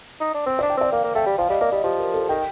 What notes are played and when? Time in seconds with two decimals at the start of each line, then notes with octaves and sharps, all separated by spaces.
0.20 D#4
0.34 D4
0.46 C4 C5
0.59 D4 D5
0.70 G5
0.77 C4 D5
0.92 A#3 F5
1.04 A#3
1.15 A3 G5
1.26 G3
1.38 F3 F5
1.49 G3 D#5
1.61 A#3 D5
1.72 G3 D#5
1.84 F3 G4
1.99 A#4
2.14 A4
2.29 D#3 G5